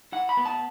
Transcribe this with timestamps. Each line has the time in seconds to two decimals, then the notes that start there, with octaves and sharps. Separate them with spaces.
0.12 E4 F#5
0.29 B5
0.37 B3
0.45 A5